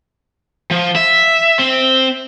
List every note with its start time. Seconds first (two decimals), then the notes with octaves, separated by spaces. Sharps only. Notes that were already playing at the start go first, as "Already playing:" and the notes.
0.71 F3
0.96 E5
1.59 C4